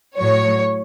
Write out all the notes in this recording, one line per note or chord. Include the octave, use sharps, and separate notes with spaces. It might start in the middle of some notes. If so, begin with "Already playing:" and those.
A2 F#3 C#5